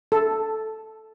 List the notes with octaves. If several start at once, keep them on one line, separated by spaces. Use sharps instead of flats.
A4